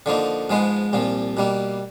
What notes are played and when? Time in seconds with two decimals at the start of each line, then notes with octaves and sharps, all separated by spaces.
0.06 D3 F3 A#3 D#4
0.50 G#2 F3 G#3 B3
0.93 C2 A#2 F3
1.37 B2 G3 A#3